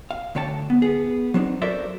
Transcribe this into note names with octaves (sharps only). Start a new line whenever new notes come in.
F5
D2 D3 C#5 G5 A5
B3
B3 G#4
F#3 C4 D4 D#4
F#4 A4 A#4 C5 D5 E5